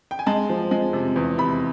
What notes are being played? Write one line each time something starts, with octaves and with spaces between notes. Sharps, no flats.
G5
G#5
G#3 A5
F3
G#3
C3
E2
C3 B5